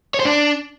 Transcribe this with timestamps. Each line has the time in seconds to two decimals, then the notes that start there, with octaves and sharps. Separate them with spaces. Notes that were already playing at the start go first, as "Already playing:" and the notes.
0.14 C#5
0.20 C5
0.25 D4